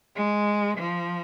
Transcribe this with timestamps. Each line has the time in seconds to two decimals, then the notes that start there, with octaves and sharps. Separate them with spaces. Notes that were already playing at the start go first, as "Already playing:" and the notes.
0.16 G#3
0.77 F3